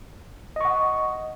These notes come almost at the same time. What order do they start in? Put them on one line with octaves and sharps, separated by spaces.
D#5 C#6 F#5